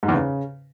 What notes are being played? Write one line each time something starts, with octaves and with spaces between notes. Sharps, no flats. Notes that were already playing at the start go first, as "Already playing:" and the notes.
G#2
E2
C#3